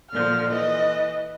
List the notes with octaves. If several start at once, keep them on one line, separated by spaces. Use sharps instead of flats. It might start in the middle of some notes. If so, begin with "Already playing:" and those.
A#2 D3 F3 F6
E3 D#5